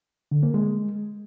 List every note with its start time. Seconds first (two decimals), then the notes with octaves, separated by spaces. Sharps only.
0.31 D3
0.43 A#3
0.54 G#3